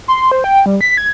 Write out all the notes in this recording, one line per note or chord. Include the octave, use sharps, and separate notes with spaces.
C6
C5
G5
G3
B6
G#6